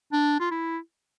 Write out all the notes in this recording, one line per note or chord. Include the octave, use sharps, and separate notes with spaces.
D4
F4
E4